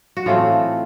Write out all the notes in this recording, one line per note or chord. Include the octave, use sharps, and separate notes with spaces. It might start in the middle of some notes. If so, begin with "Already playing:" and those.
F#4
A2 E3 A3 C4 F4